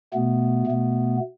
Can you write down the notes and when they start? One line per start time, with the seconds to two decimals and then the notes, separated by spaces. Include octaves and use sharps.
0.14 B2 A3 B3
0.67 B2 A3